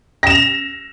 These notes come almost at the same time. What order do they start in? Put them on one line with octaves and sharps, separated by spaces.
A#6 E7 F7